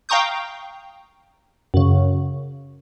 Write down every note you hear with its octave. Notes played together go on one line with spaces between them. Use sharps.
F5 G5 A#5 C#6 D#6 G6
F#2 C#3